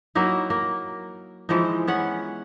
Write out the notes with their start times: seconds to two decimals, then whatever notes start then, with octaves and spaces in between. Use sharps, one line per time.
0.15 F#3 A#3 D#4 E4
0.50 A#3
1.49 E3 F3 G#3 D#4
1.87 B3 C#4 F#5